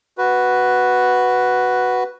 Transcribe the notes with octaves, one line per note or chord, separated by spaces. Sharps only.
F#4 B4